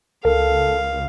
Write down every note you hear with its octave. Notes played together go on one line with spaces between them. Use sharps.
C#2 A4 A#4 F5